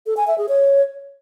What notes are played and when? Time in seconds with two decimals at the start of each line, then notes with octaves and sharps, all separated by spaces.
0.06 A4
0.17 G#5
0.27 E5
0.38 G#4
0.49 C#5